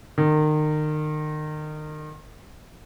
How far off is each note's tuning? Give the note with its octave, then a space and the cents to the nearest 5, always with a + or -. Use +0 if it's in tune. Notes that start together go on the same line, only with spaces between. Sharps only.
D#3 -30